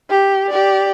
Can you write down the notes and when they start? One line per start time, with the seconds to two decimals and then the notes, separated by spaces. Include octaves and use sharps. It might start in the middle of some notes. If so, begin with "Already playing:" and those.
0.10 G4
0.49 G4 D5